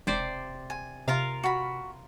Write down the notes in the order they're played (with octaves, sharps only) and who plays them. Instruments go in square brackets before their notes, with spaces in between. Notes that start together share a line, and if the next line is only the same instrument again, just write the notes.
[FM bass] E1 [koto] C3 C5 D5
[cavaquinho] G#5
[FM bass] C3 [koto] F4 A#4 F5
[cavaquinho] F#4 B5